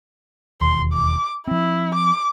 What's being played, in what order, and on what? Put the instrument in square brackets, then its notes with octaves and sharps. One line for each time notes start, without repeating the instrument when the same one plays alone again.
[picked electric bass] E1 D#2 [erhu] C6
[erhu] D6
[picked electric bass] F3 C4 [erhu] E4
[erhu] D6